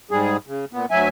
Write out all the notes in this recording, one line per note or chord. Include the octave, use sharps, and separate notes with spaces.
G#2 G3 G#4
C#3
A#2 B3
D2 F#3 E5 G#5